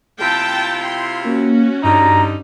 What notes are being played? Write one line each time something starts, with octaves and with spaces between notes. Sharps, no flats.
C3 E4 F4 G5 A5
C6
A#3 C#4 F#4
G2 D3 G3 D#4 A#5